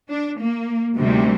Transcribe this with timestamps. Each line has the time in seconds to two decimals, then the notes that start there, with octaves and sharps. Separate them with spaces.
0.10 D4
0.40 A#3
0.97 D2 C3 D#3 G3